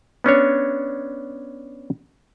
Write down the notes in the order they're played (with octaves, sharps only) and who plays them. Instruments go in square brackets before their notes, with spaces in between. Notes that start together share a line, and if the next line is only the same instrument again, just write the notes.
[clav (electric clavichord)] B3 C#4 D4 C#5